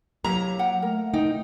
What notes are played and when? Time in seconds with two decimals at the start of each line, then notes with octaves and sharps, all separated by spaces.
0.24 F#3 A#3 E4 G4 E5 A#5
0.59 F#5 G5
0.82 A3 A#4
1.14 D#4 G5